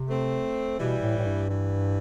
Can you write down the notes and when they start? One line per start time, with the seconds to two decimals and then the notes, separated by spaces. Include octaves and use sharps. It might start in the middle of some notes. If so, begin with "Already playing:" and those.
Already playing: C3
0.09 A3 C4
0.79 B2 E3 G3
1.03 A2
1.18 A2
1.26 G2
1.49 E3 G3